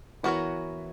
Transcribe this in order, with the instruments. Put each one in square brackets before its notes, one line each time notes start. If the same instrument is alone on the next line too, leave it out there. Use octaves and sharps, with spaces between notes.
[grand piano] E3 E4 [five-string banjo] B3 F#4 A#4 C#5